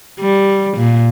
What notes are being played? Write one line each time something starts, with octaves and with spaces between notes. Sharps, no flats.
G3
A#2